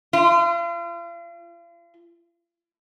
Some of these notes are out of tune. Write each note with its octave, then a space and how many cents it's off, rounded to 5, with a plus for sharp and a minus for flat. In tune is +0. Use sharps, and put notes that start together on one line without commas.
F4 -40